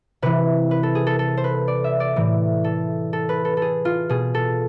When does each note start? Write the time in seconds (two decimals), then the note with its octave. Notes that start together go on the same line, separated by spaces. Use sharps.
0.22 C3 E3 B4
0.71 B4
0.83 A4
0.95 G#4
1.07 A4
1.19 A4
1.37 C5
1.44 B4
1.68 D5
1.84 E5
2.00 D5
2.16 A2 E3
2.64 A4
3.13 A4
3.29 B4
3.45 A4
3.57 G#4 A4
3.85 F4
4.09 B2 G#4
4.34 A4